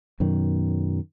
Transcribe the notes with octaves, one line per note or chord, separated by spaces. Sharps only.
F#2 B2 D#3